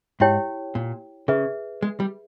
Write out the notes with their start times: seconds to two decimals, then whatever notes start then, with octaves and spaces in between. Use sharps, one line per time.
0.20 G#2 E4 G4 C#5 G5
0.75 A#2
1.28 C#3 G#4 B4 E5
1.82 G#3
2.00 G3